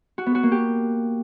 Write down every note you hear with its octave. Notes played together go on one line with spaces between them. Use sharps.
F#4
B3
F#4
A#3
G4